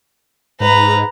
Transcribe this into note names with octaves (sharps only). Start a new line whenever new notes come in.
G#2 B4 A#5